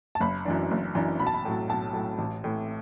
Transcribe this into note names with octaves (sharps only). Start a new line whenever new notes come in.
A5
F#1 B5
F#2 E3 D4
F#1
F#2 E3 D4
B1 B5
A5
B5
A2 F#3
B1 A5
A2 F#3
A1
A2 E3